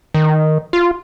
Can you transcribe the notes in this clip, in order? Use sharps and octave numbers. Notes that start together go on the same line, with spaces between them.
D#3
F4